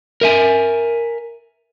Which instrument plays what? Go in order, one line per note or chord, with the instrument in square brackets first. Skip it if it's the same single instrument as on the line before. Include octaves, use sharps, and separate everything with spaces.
[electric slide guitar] A#4 E5 G#5